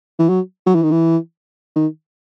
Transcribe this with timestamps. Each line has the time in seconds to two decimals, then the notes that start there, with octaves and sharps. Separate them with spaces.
0.19 E3
0.29 F#3
0.67 F#3
0.75 E3
0.83 D#3
0.91 E3
1.76 D#3